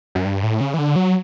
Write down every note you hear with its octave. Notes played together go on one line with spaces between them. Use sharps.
F#2
G2
A2
C#3
E3
D3
F#3